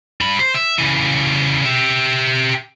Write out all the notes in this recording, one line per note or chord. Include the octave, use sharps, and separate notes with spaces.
G2 B5
C5
E5
C#3 E3
G4 E5